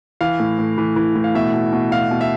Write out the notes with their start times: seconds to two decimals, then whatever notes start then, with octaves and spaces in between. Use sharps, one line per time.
0.21 E3 F5
0.40 A2
0.59 A2
0.78 E3
0.96 E3
1.16 A2
1.24 F5
1.35 B2 E5
1.54 B2
1.73 B2
1.91 B2 F5
2.11 B2
2.21 E5